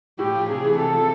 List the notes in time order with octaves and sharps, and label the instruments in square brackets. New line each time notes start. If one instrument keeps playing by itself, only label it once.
[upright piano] A2 [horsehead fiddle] G4
[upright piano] F3
[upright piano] C3 [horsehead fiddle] G#4
[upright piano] E3
[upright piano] C3 [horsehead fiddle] A4
[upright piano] F3